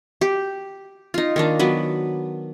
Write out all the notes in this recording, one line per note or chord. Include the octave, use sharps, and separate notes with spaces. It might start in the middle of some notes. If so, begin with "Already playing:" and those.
G4
D#4 F4
D#3 A#3 D4
F#3 B3 B4